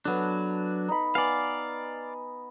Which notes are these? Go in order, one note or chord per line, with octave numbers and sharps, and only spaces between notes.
F#3 B3 D4 A4
D#4 B5
B3 D5 F5 G#5